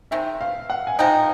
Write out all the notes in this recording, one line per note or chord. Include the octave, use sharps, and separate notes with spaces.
D#3 G#3 C4 E5
F5
F#5
G#5
F3 G#3 C4 D#4 G5